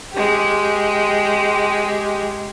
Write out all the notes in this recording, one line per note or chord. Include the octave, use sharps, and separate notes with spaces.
G#3 G4